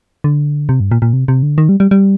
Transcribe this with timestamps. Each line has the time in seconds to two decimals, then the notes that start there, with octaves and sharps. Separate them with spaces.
0.24 D3
0.69 C3
0.80 G2
0.92 A#2
1.02 A#2
1.13 C3
1.28 C3
1.43 D3
1.58 D#3
1.69 G3
1.80 G3
1.91 G3